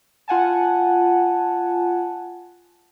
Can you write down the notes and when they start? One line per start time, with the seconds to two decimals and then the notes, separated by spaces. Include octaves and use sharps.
0.28 F4 F#5 G#5 A5